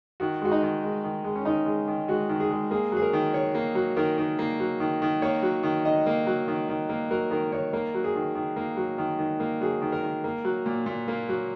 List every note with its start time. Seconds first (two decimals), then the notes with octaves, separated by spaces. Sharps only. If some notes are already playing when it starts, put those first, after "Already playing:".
0.20 D#3 F#4
0.42 G#3 F#4
0.52 D#4
0.62 D#3
0.83 G#3
1.04 D#3
1.24 G#3
1.36 C#4
1.45 D#3 D#4
1.66 G#3
1.88 D#3
2.08 G#3 F#4
2.29 D#3
2.40 G#4
2.51 G#3
2.71 A#3 G#4
2.92 F#3 G#4
3.02 A#4
3.13 D#3
3.34 D#3 C#5
3.55 A#3
3.75 F#3
3.96 D#3 A#4
4.18 D#3
4.39 A#3
4.60 F#3
4.80 D#3
5.02 D#3
5.22 A#3 C#5
5.42 F#3
5.63 D#3
5.85 D#3 D#5
6.06 A#3
6.27 F#3
6.48 D#3
6.69 D#3
6.89 A#3
7.11 F#3 A#4
7.31 D#3 A#4
7.52 D#3 C#5
7.73 A#3 A#4
7.95 F#3
8.04 G#4
8.15 D#3
8.35 D#3
8.56 A#3
8.77 F#3
8.98 D#3
9.19 D#3
9.40 A#3
9.61 F#3 G#4
9.82 D#3
9.92 A#4
10.02 D#3
10.24 A#3
10.45 F#3
10.66 A#2
10.86 A#2
11.08 A#3
11.29 F#3